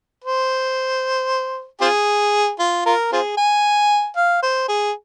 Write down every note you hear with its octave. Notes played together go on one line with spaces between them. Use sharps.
C5
C4 F4 G#4
F4
F4 A#4
C4 F4 G#4
G#5
F5
C5
G#4